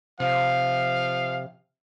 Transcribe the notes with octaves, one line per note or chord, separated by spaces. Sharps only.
C3 F3 F5